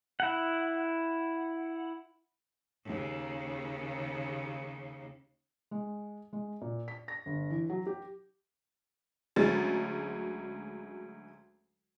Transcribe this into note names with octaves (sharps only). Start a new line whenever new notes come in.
E4 F#5
D#2 C#3
G#3
G#3
A#2
B6
A#6
G1
E3
F#3
G4
D2 F#3 G#3 C#4 A6